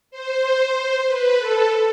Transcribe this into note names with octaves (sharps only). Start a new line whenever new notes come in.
C5
B4
A4